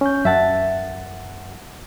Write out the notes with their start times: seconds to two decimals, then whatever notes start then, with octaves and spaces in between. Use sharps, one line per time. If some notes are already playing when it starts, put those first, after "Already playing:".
0.01 C#4 G6
0.25 F#2 E5 F#5 A5